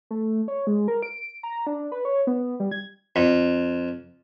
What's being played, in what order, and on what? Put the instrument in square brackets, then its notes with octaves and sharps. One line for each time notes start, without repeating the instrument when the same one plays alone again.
[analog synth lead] A3
C#5
G#3
A#4
D7
A#5
D4
B4
C#5
B3
G3
G#6
[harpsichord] F2